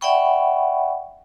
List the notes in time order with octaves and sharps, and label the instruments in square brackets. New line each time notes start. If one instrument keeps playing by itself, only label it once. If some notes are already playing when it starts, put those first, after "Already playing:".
[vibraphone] D5 E5 F#5 G5 B5 C#6